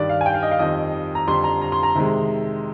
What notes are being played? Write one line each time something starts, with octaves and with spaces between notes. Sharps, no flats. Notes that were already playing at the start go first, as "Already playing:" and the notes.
Already playing: G2 D#3 G3 D5
F5
G#5
G5
F5
D#5
F5
F2 D#3 G3 D#5
A#5
F2 D3 G3 C6
A#5
A#5
C6
A#5
C3 D#3 G#3